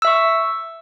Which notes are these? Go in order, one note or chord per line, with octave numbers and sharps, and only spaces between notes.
E5 C#6 E6